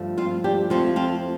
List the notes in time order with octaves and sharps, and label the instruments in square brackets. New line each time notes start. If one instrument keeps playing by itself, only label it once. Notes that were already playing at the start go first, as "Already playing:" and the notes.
Already playing: [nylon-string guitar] G2 F3 A3
C4 F4
D4 G4
F2 F3 A3 C4 F4
C4 F4